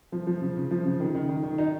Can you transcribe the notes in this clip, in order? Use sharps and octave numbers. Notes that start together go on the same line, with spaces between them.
F3
F3
C#3
C#3
F3
C#3
D#3
D#3
D#3
D#3
D#4